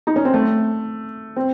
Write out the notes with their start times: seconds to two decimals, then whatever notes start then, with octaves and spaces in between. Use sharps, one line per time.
0.07 D#4
0.16 C#4
0.25 C4
0.34 A3
1.36 C4